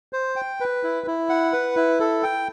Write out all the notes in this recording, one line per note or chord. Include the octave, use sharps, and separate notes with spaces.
C5
G5
B4
E4
E4
F#5
B4
E4
A4
G5